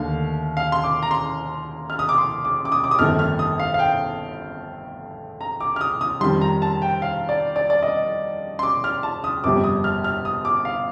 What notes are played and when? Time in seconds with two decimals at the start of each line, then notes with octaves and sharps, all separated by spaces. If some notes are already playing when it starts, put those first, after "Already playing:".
Already playing: D#2 D3 A3 F5
0.57 F5
0.72 C6
0.84 D6
1.03 A#5
1.11 C6
1.90 F6
1.99 D#6
2.09 D6
2.18 C6
2.45 D6
2.65 D6
2.72 D#6
2.84 D6
2.91 D#6
2.99 G1 F2 D#3 A3 F6
3.19 F6
3.39 D#6
3.60 F5
3.74 F5
3.79 G5
5.41 A#5
5.60 D6
5.76 F6
5.81 D#6
6.01 D#6
6.21 F2 D#3 G3 C6
6.41 A#5
6.62 A5
6.82 G5
7.02 F5
7.29 D5
7.56 D5
7.70 D5
7.83 D#5
8.59 C6
8.63 D6
8.84 F6
9.03 A5
9.24 D#6
9.44 G1 F2 C3 G3 D6
9.64 D#6
9.84 F6
10.04 F6
10.25 D#6
10.45 D6
10.65 F5